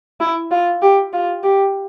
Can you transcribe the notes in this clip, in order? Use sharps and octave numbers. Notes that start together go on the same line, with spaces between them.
E4
F4
G4
F4
G4